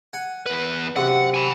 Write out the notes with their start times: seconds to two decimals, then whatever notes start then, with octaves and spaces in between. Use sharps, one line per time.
0.13 F#5 G#5
0.46 E2 B4
0.96 F#2 C3 F#5
1.34 G#5 B5